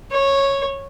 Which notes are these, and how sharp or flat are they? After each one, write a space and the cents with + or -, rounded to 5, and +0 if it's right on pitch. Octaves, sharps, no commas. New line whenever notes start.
C#5 -10